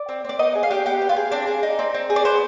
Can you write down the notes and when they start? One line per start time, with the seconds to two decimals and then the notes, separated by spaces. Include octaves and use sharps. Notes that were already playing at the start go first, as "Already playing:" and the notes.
Already playing: D5
0.09 C4
0.25 C4 D5
0.39 B3 D#4 D#5
0.55 G#4
0.63 F5
0.70 D4 G4 G5
0.86 B3 G4 G5
1.01 B3
1.09 F4 F5
1.16 G#4
1.32 C4 D4 D5
1.47 G#4
1.63 D#4
1.79 C4
1.94 C4
2.10 G#4
2.16 D5
2.25 B3 C5